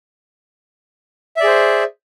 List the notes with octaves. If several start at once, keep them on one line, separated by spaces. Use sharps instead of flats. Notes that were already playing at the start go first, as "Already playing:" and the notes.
G#4 C5 D5 E5